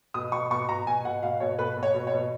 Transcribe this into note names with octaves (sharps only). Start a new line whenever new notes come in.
B2 D#6
B2 C#6
B2 C#6
B2 A#5
B2 G#5
B2 F#5
B2 F5
B2 C#5
B2 B4
B2
C#5
B2
C#5
B2